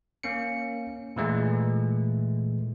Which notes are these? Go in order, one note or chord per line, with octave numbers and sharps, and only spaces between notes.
A#3 C#4 C#7
A#2 E3 G#3 A3